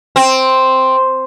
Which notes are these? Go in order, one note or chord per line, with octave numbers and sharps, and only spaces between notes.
C4